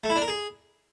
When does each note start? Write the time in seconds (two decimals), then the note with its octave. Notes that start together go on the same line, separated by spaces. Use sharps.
0.04 A3
0.10 E4
0.16 D4
0.22 A#4
0.28 G#4